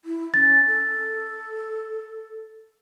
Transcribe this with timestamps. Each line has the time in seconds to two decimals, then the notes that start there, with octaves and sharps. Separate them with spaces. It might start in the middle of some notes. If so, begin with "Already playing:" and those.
0.05 E4
0.34 C#4 A6
0.67 A4